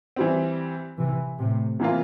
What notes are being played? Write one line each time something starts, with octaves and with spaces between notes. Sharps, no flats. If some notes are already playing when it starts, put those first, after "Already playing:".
E3 G3 C4
C3 E3
A2 C3
C3 E3 A#3 F4